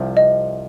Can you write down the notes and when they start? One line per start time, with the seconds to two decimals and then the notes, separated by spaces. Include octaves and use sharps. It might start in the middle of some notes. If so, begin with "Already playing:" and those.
Already playing: C2 C3 F3
0.17 D#5